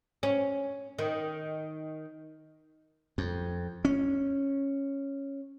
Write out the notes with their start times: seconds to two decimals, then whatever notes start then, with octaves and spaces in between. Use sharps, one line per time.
0.23 C#4
0.99 D#3
3.18 F2
3.85 C#4